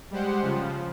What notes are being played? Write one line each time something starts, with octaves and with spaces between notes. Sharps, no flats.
G3 G#3 G4 C5 F#5
C#3 F3